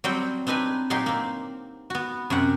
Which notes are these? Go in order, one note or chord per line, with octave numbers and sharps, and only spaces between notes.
F#3 G3 C4 G5
C4 D4 D#4 B4 G#5
A#2 F#3 D#4 G4 C6
A#3 C4
B3 F#4
F#2 C3 G4 F#5